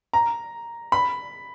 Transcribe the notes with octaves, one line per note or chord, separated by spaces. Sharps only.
A#5
B5